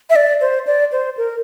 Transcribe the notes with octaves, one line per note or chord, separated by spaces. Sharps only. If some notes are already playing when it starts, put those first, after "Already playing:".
E5
D5
C5
D5
C5
A#4